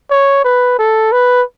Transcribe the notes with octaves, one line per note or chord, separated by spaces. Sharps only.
C#5
B4
A4
B4